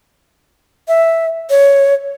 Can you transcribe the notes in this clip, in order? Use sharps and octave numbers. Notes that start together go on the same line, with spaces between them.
E5
C#5